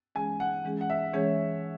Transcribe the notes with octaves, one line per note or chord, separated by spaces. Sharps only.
E3 G#3 C#4 G#4 G#5
F#5
E3 G#3 C#4 G#4
F#5
E5
E3 G#3 C#4 G#4 C#5